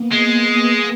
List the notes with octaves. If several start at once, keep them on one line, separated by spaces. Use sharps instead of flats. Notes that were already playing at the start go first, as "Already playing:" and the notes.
Already playing: A#3 B3
G#3